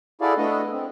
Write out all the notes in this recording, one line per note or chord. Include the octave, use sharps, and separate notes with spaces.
E4 F#4 G#4 A4 D5 F5
A3 B3 D4 A4 D#5
C4